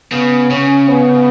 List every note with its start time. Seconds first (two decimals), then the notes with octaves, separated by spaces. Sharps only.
0.12 C#3 B3
0.50 C#3 C#4
0.89 B3